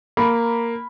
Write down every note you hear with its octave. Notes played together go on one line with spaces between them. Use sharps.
A#3 B5